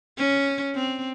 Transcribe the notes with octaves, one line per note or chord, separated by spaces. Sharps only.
C#4
C4